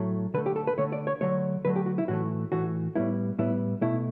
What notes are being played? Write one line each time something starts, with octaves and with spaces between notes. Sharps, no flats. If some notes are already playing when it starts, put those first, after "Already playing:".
Already playing: A2 F#3 A3
D3 A3 B4
G4
A4
B4
D3 A3 C#5
D5
C#5
D3 F#3 A3 C#5
D3 F#3 A3 B4
G4
F#4
E4
A2 E3 A3 F#4
A2 E3 A3 F#4
A2 G3 B3 E4
A2 G3 B3 E4
B2 A3 E4